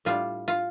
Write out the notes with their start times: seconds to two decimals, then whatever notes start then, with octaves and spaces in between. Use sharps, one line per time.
0.05 A2 G3 D4 F4
0.48 F4